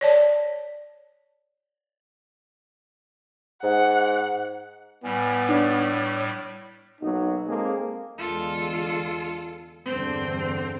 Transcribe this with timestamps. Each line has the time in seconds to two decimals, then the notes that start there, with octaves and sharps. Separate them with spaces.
0.01 C#5 D5 A5
3.64 G#2 F#5
5.04 A2 G3 B3 G#5
5.49 D4 C#5
7.01 B1 F#3 A#3 D#4
7.47 G#3 A#3 C4 G#4 A4
8.18 E2 D3 G#3 F4 A4
9.85 E2 G2 D3 C4